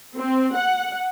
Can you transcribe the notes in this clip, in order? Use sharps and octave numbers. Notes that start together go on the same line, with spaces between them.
C4
F#5